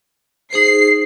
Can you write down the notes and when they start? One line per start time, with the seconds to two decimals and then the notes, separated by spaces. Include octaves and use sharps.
0.53 D#4 G#4 C5 C7